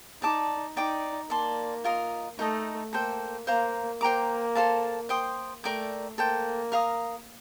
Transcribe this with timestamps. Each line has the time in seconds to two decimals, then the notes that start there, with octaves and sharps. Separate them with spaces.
0.22 D#4 D5 A5 D6
0.76 D#4 D5 G5 D6
1.30 A#3 D5 A5 C6
1.84 F4 A#4 D#5
2.39 A3 D#4 A4 D#5
2.93 A#3 A4 C5 G5
3.47 A#3 C5 F5 A#5
4.01 A#3 C5 G5 A#5 D6
4.55 A4 C5 F5 A5
5.09 C5 G5 C6 D#6
5.64 A3 A#4 D5 G5 D6
6.17 A#3 A4 C5 G5
6.72 A#4 F5 A#5 D#6